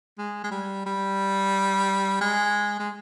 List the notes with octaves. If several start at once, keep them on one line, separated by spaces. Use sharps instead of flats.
G#3
G#3
G3
G3
G#3
G#3